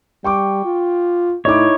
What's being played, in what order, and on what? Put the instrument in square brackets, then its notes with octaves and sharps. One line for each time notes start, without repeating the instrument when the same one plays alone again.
[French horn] G3 [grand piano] G5 C#6 D6
[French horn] F4
[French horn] A2 [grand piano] D#4 E4 D6 [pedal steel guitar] C#5